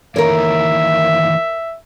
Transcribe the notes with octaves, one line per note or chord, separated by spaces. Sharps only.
D#3 E3 A#3 A#4 C#5 E5